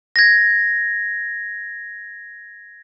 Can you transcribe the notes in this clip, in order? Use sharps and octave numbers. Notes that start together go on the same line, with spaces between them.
G#6 A#6